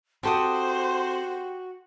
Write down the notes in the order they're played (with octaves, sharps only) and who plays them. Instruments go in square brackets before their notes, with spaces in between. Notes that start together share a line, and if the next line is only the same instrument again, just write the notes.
[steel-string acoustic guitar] C4 A4 [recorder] F#4 [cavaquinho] G4 A5 D#6 [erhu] C5